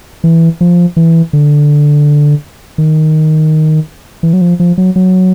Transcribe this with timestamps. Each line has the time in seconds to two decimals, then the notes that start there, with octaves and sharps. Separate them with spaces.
0.24 E3
0.61 F3
0.97 E3
1.33 D3
2.78 D#3
4.23 E3
4.33 F#3
4.41 F3
4.60 F3
4.78 F#3
4.96 F#3